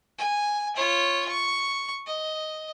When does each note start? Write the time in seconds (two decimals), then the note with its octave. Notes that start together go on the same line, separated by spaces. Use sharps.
0.18 G#5
0.76 F4 C#5
1.28 C#6
2.06 D#5